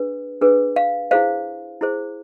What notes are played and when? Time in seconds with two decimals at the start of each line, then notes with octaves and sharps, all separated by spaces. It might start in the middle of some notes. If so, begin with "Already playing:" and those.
Already playing: D4 G#4 B4
0.41 D4 G#4 B4
0.76 F5
1.11 E4 G#4 C5 F5
1.81 E4 G#4 C5